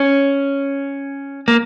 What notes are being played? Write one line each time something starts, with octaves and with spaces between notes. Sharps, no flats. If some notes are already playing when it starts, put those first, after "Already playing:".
Already playing: C#4
A#3